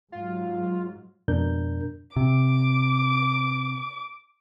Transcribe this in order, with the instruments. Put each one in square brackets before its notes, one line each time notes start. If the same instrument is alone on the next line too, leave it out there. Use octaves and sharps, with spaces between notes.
[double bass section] G#2 F#3 [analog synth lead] F4
[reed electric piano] F2 G#2 B2 D4 A#4 G6
[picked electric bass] C3 [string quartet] D6